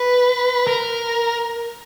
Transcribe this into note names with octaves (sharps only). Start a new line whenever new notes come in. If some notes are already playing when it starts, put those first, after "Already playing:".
Already playing: B4
A#4